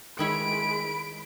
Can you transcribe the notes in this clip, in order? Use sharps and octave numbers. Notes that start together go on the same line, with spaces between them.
D#3 G#3 E4 C#5 B5 D7